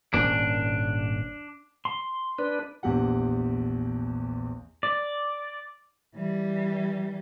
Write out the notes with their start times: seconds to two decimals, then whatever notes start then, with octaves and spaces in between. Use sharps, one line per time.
0.14 D#1 G#1 C#4 D4
1.85 C6
2.39 D4 B4
2.83 A#1 E2 G4 F#5
4.83 D5
6.15 E3 G3